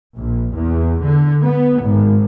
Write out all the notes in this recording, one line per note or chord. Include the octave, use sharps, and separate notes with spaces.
A#1
E2
D3
B3
G#1